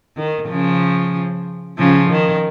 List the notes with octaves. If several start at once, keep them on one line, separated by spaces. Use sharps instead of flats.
D#3
C#3 F3
C#3 F3
D#3